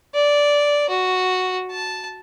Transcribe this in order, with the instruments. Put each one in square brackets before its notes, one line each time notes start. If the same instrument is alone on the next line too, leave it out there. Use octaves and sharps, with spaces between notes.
[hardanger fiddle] D5
F#4
A5